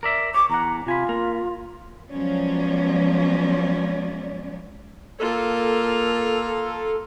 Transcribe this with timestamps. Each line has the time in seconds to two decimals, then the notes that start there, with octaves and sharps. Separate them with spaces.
0.03 A#4 D5 E5
0.34 C#5 D6
0.50 E2 F#5 A#5
0.86 C3 F4 G#5 B5
1.09 A#3 A#4
2.11 F3 F#3 G#3 B3 C#4 D5
5.20 A#3 F4 A4